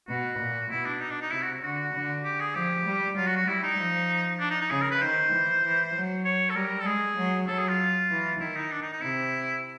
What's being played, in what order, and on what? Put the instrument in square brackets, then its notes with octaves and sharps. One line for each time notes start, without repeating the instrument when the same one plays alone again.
[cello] B2 [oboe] F#4
[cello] A#2
[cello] B2 [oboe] E4
[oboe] D4
D#4
D4
D#4
[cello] C3 [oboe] E4
[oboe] F#4
[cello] D3 [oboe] F#4
[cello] D3
[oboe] G4
G#4
[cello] F3 [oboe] G4
[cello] G3
[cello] F#3 [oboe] F4
[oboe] F#4
F#4
[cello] G3 [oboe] E4
[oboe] D#4
[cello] F3
[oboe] D4
D#4
D#4
[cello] C#3 [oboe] G#4
[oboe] A#4
B4
[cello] D#3 [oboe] C5
[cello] E3
E3
F#3
[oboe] C#5
A4
[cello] G3 [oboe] A#4
[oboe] A4
[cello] G#3 [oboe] G#4
[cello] F#3
[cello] F#3 [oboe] A4
[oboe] G#4
F4
[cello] E3
[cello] D#3 [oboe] E4
[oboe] D#4
D4
D#4
D#4
[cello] C3 [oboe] E4